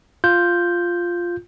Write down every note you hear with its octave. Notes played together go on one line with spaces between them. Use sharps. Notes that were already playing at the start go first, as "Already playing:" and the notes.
F4 G6